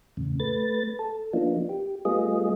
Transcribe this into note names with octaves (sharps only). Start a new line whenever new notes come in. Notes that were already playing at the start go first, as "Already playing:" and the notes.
E2 A2 C#3
A3 B4 A6
A4
F3 A#3 B3 D4 D#4 F4
G4
G3 A3 B3 F4 G#4 D#5